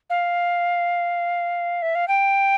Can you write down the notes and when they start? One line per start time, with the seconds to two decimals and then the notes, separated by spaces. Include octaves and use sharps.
0.10 F5
1.82 E5
1.95 F5
2.08 G5